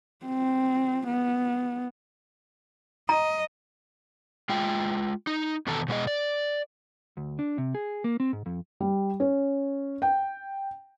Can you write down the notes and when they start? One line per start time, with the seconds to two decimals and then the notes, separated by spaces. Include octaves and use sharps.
0.25 C4
1.07 B3
3.09 D#5 A#5
4.49 G#3 F4 G5
5.27 D#4
5.67 E2 B2 D#3 A4 A5 A#5
5.88 B2 G#3 B3 G#4 D#5
6.07 D5
7.17 D2
7.39 D4
7.58 C3
7.75 G#4
8.04 A#3
8.20 C4
8.33 G#2
8.46 F2
8.80 G3
9.20 C#4
10.02 G5